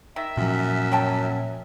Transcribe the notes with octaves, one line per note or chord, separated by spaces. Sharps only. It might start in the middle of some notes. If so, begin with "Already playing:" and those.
D#3 E5
F#2 A#2 F3
F#3 G5 A5